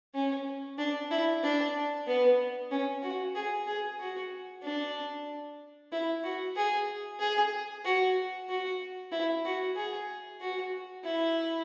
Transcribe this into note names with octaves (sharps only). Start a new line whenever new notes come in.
C#4
D4
E4
D4
B3
C#4
F#4
G#4
G#4
F#4
D4
E4
F#4
G#4
G#4
F#4
F#4
E4
F#4
G#4
F#4
E4